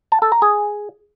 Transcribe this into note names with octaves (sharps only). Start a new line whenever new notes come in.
A5
A4
A#5
G#4